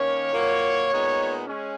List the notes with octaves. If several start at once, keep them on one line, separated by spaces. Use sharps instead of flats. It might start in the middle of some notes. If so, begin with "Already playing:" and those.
Already playing: D#3 A#3 C#4 C#5
A#2 F#3 A#3
A#2 G#3 B3 D#4
G#3 C#4